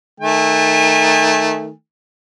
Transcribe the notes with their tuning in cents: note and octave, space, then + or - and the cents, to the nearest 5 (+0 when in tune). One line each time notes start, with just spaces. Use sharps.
D#3 +0 A3 -5 G#5 -40